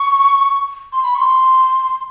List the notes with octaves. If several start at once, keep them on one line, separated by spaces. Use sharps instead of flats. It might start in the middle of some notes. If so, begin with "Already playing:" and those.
Already playing: C#6
C6
B5
C#6
C6